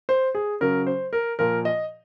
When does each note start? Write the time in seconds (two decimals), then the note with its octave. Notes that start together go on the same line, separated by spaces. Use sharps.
0.09 C5
0.35 G#4
0.61 C#3 F#3 A#4
0.87 C5
1.13 A#4
1.39 A#2 F3 A#4
1.65 D#5